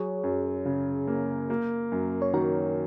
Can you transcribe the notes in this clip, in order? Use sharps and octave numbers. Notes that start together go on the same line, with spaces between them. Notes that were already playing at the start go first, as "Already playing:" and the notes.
Already playing: F#3 G#4 C#5
F#2
C#3
A#3
A#3
F#2
C#5
D#3 F#4 A#4